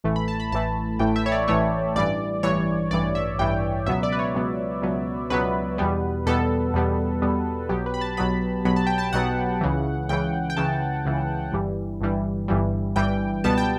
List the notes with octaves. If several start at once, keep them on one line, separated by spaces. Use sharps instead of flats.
A1 A2 E3 A3
B5
A5
B5
A1 A2 E3 A3 A5
A1 A2 E3 A3 G5
E5
C#5
D5
A1 A2 E3 A3 C#5
A1 G2 E3 D5
A1 G2 E3 C#5
A1 G2 E3 D5
E5
A1 G2 E3 G5
C#2 B2 F#3 B3 E5
D5
B4
C#5
C#2 B2 F#3 B3
C#2 B2 F#3 B3
C#2 B2 F#3 B3 B4
E2 B2 G3 B3
E2 B2 G3 B3 A4
E2 B2 G3 B3
E2 B2 G3 B3
B1 B2 F#3 B3 G4
B4
B5
A5
B1 B2 F#3 B3 B5
B1 B2 F#3 B3 B5
A5
G5
A5
B1 B2 F#3 B3 F#5
C#2 C#3 E3
C#2 C#3 E3 G5
G5
C#2 C#3 E3 A5
C#2 C#3 E3
G1 G2 E3 G3
G1 G2 E3 G3
G1 G2 E3 G3
G1 G2 E3 G3 G5
C#2 B2 G3 B3 A5
G5